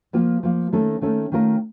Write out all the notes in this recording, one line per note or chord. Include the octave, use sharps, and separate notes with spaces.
F3 A#3 F4
F3 A#3 F4
D#3 A3 C#4 A4
D#3 A3 C#4 A4
D#3 A3 C#4 F4 A#4